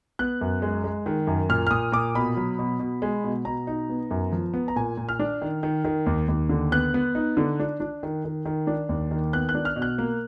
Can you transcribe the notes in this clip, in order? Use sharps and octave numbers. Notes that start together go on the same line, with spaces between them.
B3 F#6
F#2
G#3
G#3
D#3
F#2
A#2 F6
F6
A#2 D#6
A#2 D6
B2 B5
F#3
B2
B2
G#3
B2
B2 A#5
D#4
B3
F#2
F3
B3
A#5
A#2 G#5
A#2
F6
D4
D#3
D#3
D#3
D#2
D#2
D3
B3 F#6
B3
D#4
D3
D4
D4
D#3
D#3
D#3
D4
D#2
D#3
B3 F#6
F#6
D4
F6
B2
F#6
A#3